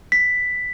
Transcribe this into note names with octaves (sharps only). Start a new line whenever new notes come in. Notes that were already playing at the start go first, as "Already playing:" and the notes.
B6